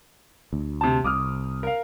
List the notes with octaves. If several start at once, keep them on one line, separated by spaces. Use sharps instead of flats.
D2
C3 A5
C2 D6 D#6 F6
A#4 F5